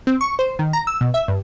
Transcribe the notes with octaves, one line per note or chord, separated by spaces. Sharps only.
C4
C#6
C5
D#3
A#5
E6
B2
E5
G2